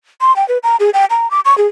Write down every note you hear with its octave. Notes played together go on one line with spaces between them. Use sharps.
C6
G5
B4
A#5
G#4
G5
A#5
D6
C#6
G#4